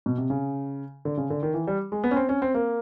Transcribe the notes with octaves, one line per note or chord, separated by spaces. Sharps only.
B2
C3
C#3
D3
C#3
D3
D#3
E3
G3
G#3
B3
C#4
C4
C#4
C4
A#3